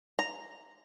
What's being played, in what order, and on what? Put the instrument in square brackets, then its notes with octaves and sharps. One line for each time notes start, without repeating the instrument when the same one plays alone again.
[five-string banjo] A#5